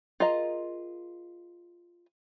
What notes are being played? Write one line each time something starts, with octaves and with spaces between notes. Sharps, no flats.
F4 G#4 A#4 D#5 A#5